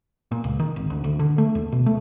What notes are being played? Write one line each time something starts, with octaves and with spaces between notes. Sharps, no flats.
A#2
C#2
D#3
G#1
D2
D2
D3
A3
D#2
B2
A3